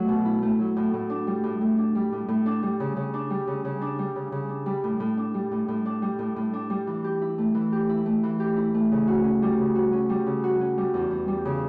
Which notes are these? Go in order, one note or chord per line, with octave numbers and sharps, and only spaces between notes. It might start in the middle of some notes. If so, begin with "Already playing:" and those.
Already playing: F#3 A3
B2
E4
A3
F#3
A2
A2
D4
G3
A2
A2
D4
G3
A2
A2
D4
G3
C#3
C#3
D4
G3
C#3
C#3
D4
G3
C#3
C#3
D4
G3
A2
A2
D4
G3
A2
A2
D4
G3
A2
A2
D4
G3
E3
G4
E4
A3
E3
G4
E4
A3
E3
G4
E4
A3
C#3
F#4
C#4
G3
C#3
F#4
C#4
G3
C#3
F#4
C#4
G3
E2
E2
G3
C#3